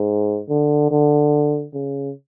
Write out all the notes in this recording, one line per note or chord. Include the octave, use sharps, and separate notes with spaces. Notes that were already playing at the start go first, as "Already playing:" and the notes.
Already playing: G#2
D3
D3
C#3